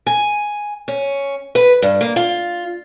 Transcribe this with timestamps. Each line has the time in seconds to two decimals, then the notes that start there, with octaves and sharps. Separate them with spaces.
0.07 G#5
0.88 C#4
1.55 B4
1.82 G2
2.01 A#3
2.16 F4